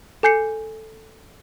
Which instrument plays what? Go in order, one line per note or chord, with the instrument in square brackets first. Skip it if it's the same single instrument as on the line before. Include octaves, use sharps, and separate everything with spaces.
[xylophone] A4 G#5 G6 C7 C#7